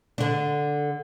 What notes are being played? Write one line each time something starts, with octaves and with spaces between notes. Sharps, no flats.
D3 D4